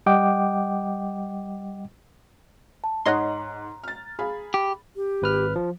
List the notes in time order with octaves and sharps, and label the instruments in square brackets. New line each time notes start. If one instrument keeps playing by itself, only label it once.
[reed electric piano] G3 D#5 F#5 G5 D6
[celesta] A5
[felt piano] G#2 F#5 F#6 [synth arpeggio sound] C#5 D#5 C6 [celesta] A#5
[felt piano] F6 A6
G#4 F5 B5
[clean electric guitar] G4
[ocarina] G4
[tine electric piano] G#1 B4 F6
F3